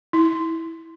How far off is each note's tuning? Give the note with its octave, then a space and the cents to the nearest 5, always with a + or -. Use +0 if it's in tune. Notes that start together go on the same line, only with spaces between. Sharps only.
E4 -10